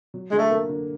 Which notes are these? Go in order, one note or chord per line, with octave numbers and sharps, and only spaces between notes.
F#3
D3 G#3
A3
A#3
D3